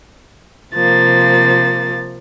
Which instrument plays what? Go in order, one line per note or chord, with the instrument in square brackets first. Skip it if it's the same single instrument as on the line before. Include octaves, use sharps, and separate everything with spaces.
[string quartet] C3 F3 A#3 A6